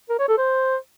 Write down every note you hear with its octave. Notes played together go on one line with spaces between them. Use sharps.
A#4
C#5
A4
C5